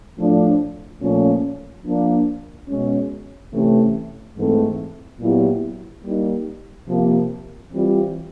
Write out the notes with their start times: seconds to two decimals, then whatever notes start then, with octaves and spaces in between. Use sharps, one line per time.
0.17 A2 F3 A3 D4
1.00 A#2 F3 A3 C#4
1.84 F3 A#3 D4
2.68 B2 G#3 C#4
3.51 C3 E3 A3 C#4
4.36 G#2 E3 A3 C4
5.18 A#2 F#3 B3 E4 G4
6.02 G3 A#3 D#4
6.87 C3 F3 A#3
7.71 E3 G3 C4 F4